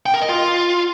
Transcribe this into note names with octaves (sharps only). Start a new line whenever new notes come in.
G5
A#4
D#5
F4